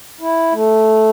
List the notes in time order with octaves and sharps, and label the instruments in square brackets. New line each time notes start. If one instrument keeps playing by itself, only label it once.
[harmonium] E4
A3